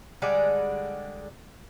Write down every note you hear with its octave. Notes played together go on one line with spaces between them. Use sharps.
D3 G3 G#3 D5